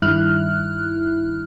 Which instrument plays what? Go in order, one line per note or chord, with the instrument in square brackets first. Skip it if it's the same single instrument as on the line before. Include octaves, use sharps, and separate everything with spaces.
[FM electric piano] G2 D#3 E4 F6 F#6